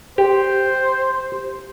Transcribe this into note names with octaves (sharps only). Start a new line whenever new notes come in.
G4 C5